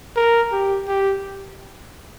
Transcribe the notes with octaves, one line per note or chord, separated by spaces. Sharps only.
A#4
G4
G4